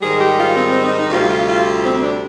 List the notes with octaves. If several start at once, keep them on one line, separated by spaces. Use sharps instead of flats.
G#2 D#3 G3 G#4
G4
F4
C4
C4
D#4
D#4
D2 C3 G3 F4
F4
F4
C4
C4
D4